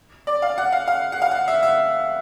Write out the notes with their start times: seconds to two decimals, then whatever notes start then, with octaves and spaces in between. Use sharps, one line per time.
0.27 D5
0.42 F5
0.58 F#5
0.72 F5
0.88 F5
1.12 F#5
1.22 F5
1.31 F#5
1.48 E5
1.63 E5